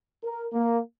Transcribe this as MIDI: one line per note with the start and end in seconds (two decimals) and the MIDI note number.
0.23 0.45 70
0.53 0.80 58